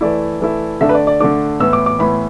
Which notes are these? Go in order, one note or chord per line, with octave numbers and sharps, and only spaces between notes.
E3 A3 E4 D5
E3 A3 E4
D3 A3 D4 E5
B4
D5
D5
D3 A3 D4 D6
A2 E3 B3 E6
D6
D6
A2 E3 B3 B5